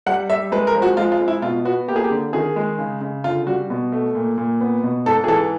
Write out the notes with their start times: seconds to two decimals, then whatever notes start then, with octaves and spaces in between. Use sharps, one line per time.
0.06 G3 F#5
0.29 G3 E5
0.52 G#3 B4
0.67 A#4
0.75 F3
0.82 F#4
0.97 G#3 F4
1.12 F4
1.20 G#3
1.28 E4
1.42 B2 F4
1.65 B3 F#4
1.88 A#3 G4
1.96 G#4
2.04 G4
2.11 D3
2.33 D#3 G#4
2.56 G#3
2.79 C#3
3.01 C#3
3.24 D3 F4
3.47 G3 F#4
3.70 B2
3.92 A3
4.15 A#2
4.38 A#2
4.61 B3
4.83 B2
5.06 G#2 A4
5.24 G#4
5.28 E3 A4